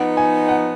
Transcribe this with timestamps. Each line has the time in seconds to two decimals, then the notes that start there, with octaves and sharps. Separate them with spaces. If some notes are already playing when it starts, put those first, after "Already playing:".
Already playing: F3 B3 D#4 F#5
0.17 G#5
0.49 F#5